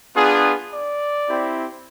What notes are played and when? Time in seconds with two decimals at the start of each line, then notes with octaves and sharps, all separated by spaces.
0.16 B3 D4 F4 G#4
0.72 D5
1.28 C4 E4 G4